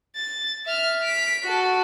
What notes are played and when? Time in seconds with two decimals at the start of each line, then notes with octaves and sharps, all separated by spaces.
0.16 A6
0.66 E5 F6
1.03 B6 D7
1.44 F#4 A4